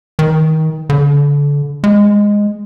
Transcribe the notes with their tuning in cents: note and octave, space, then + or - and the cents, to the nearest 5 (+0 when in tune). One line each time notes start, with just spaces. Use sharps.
D#3 +25
D3 -30
G#3 -10